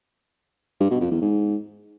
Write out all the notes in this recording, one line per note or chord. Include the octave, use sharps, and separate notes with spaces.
G2
B2
F2
E2
G#2